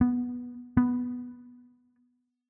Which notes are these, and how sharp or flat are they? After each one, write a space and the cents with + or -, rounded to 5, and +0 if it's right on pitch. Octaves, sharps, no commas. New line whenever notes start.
B3 -5
B3 -5